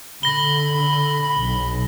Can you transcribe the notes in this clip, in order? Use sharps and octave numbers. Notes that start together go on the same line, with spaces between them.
D3 B5 A#6 G7
B1